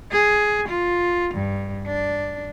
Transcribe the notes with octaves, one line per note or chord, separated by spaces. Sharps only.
G#4
F4
G2
D4